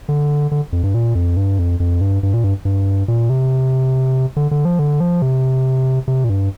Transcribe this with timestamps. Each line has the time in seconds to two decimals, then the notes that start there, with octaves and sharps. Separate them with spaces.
0.09 D3
0.51 D3
0.73 F2
0.83 G2
0.94 A#2
1.15 F2
1.37 G2
1.59 F2
1.80 F2
2.01 G2
2.23 G2
2.34 A#2
2.44 G2
2.65 G2
3.08 A#2
3.30 C3
4.37 D3
4.51 D3
4.65 F3
4.79 D3
5.00 F3
5.22 C3
6.08 C3
6.24 A#2
6.30 G2